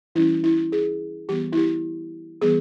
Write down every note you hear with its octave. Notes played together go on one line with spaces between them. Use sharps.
E3 G3 C#4 E4
E4
G#4
E3 G3 B3 G4
E4
G4
E3 G3 B3 G#4